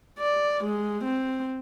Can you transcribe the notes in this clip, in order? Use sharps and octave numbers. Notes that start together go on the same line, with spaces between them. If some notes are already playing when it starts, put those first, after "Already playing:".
D5
G#3
C4